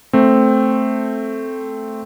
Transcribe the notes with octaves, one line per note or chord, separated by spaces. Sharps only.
A3 C4